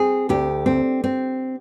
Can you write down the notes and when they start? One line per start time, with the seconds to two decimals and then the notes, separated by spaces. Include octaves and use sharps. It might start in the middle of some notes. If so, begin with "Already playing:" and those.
Already playing: C4 G#4
0.29 D2 G4
0.66 C4
1.04 C4